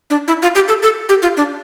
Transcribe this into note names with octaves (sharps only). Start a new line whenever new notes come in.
D4
E4
F4
G4
A4
A4
G4
F4
D4